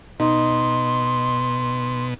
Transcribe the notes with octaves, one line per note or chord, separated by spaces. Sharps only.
B2 D#4 C6